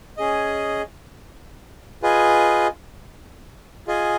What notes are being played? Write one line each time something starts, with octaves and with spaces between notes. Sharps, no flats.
C#4 G#4 D#5
F4 G#4 B4 D#5 G#5
F4 G#4 D#5 G#5